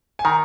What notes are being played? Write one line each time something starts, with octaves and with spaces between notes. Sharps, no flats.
G#5
D#3 A#5